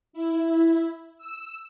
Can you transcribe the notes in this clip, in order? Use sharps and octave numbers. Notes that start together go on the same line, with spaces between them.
E4
E6